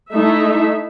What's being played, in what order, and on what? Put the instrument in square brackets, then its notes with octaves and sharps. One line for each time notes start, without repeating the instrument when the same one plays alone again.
[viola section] A3 D#4 E4 A4 E5